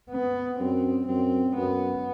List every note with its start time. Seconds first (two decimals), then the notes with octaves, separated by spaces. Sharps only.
0.11 B3
0.59 F#2 C4
1.08 F#2 C4
1.57 F#2 B3